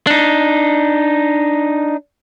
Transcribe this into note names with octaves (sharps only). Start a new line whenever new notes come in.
D4 D#4